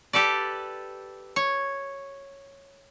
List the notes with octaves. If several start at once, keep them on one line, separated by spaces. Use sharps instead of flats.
G4 A4 B4 D5
C#5